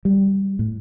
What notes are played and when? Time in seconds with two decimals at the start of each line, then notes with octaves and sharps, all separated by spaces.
0.05 G3
0.59 A2